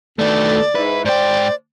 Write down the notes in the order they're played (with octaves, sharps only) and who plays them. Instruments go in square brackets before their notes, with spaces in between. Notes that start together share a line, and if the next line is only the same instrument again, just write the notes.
[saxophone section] D2 B3 A4 [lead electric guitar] D#3 A3 [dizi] D5
[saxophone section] G#2 E4 [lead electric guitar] B4
[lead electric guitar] G#2 G5 [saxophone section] C5 [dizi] D5